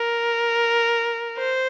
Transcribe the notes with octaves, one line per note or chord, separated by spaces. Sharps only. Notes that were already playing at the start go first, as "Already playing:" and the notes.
Already playing: A#4
C5